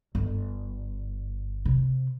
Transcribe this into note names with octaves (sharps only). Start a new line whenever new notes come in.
G1
C3